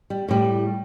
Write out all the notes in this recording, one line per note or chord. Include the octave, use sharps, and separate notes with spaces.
G3
A2 G3